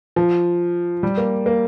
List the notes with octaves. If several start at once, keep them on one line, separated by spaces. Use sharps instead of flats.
F3
G3
A#3
A#3